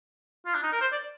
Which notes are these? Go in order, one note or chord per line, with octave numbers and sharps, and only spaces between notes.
F4
D4
D#4
A#4
C5
D5